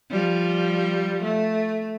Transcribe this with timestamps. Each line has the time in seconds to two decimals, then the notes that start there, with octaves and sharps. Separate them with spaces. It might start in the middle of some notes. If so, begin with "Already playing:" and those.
0.11 F3 G3
1.23 A3